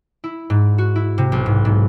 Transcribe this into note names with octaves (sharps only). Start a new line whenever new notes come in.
E4
G#2
F#4
E4
C3
B1
G#2
G#2